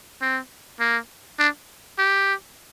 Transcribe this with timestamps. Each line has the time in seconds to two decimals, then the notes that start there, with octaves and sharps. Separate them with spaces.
0.22 C4
0.80 A#3
1.39 D4
1.99 G4